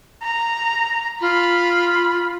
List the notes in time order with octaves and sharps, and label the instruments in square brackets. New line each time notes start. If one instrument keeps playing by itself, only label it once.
[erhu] A#5
[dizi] F4 [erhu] B5